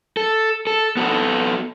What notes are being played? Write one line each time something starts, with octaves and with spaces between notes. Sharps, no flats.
A4
A4
B3 F#4 A4